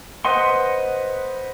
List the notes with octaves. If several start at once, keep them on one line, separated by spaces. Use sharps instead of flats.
B4 C5 D#5 F#5 C6